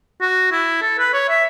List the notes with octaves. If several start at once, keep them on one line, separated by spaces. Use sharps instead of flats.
F#4
E4
A4
B4
C#5
E5